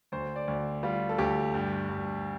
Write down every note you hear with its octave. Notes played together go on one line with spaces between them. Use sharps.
D2 C5
D5
D2
G3 F4
A4
D2 G4
G2
G2